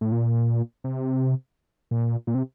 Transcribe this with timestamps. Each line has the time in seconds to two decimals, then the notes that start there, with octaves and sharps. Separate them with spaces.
0.01 A2
0.12 A#2
0.84 C3
1.91 A#2
2.27 A#2
2.35 C3